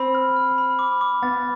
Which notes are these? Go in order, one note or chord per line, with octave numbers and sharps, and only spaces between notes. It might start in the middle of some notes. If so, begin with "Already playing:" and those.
Already playing: C4 B5
F6
F6
B5
D6
D6
B3 A6